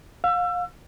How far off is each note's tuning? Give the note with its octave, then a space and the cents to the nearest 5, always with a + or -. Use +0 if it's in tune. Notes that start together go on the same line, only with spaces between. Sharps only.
F5 +30 E6 +30